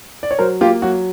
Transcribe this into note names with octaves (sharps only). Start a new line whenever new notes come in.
D5
C#5
F#3 A#4 C5
A#3 F4 G4
F#3 F#4